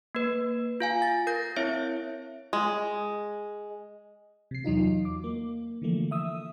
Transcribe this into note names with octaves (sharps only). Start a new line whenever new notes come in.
A#3 B4
F4 F5 G#5
A6
A#4 G6 A#6
C4 E4 C#5 E5
G#3
C3 C7
E2 F#3 D#4 F4
D6
A#3
D3 E3 F3 A3 A#3
E5 D#6 E6